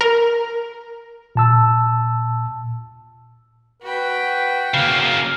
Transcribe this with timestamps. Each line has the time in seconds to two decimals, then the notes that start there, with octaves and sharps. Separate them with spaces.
0.01 A#4
1.35 A#2 A5 E6
3.83 F#4 B4 G5
4.74 C#3 A#3 F5